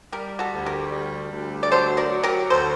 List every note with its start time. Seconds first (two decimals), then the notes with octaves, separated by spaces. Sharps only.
0.12 G3 G4 A#4
0.39 F#4 A4
0.53 D2
0.66 G4 A#4
0.92 G3
1.32 D2
1.63 D5
1.71 F#3 A4 C5
1.97 A#4 D5
2.11 F#3
2.23 G4 A#4
2.50 D2 A4 C5